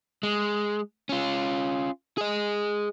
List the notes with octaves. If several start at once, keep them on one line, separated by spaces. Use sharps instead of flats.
G#3
C#4 F4
G#4 D#5